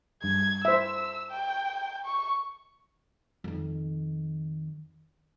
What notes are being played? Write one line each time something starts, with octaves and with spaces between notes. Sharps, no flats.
G2 G#6
C5 E5 E6
G5
C#6
F2 D#3